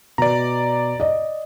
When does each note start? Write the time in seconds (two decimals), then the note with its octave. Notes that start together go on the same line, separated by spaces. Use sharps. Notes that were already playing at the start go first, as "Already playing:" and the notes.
0.18 B2 D5 A#5
1.00 D5 D#5